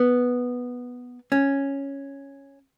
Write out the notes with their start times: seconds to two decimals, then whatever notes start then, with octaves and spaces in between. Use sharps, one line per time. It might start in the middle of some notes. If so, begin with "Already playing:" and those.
Already playing: B3
1.32 C#4